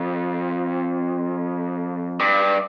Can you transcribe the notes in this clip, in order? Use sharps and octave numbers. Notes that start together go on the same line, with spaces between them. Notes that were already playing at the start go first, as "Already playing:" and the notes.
Already playing: F2
G2